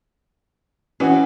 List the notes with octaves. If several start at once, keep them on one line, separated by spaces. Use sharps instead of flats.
E3 C#4 F#4 D#5